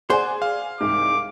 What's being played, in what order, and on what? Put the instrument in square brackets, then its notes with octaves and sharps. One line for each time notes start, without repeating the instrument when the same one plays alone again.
[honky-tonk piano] G#4 D5 G#5 [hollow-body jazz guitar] C5 [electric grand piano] F#5
[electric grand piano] F5
[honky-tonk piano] C2 G#2 [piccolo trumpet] D6